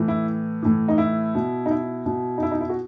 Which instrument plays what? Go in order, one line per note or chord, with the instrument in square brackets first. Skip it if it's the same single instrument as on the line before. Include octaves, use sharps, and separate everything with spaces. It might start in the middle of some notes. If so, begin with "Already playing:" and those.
Already playing: [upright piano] A2 E3
E4
A2 E3
D#4
E4
B2
D#4
E4
B2
D#4
E4
D#4
E4
F#4